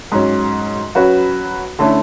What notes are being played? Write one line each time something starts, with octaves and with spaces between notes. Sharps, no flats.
G#2 F#3 C#4
F#3 C#4 F#4 B4
D3 A3 C#4 E4